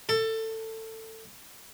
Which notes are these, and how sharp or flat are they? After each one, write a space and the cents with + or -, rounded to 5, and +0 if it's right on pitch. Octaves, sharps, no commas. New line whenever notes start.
A4 +20